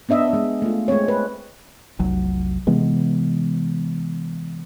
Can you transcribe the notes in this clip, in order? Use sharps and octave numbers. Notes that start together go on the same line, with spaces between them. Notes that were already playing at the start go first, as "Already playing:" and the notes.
B3 D4 D#5 E5
G#3 B3
A3 F4
G#3 A3 C4 C#5
B4
F1 B1 F#3
C3 E3 G#3 B3